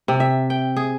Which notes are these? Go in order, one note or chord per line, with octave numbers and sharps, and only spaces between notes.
C3
E5
G5
G#4